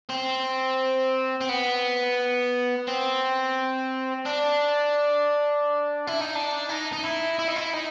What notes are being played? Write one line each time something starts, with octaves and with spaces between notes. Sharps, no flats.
C4
C4
B3
C4
D4
E4
D#4
D4
D#4
D#4
E4
E4
D#4
E4
D#4